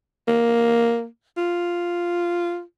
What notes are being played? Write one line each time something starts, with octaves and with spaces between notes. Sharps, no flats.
A#3
F4